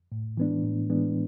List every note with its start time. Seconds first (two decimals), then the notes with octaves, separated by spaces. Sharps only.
0.12 A2
0.37 E3 G#3 B3 D4
0.64 A2
0.90 E3 G#3 B3 D4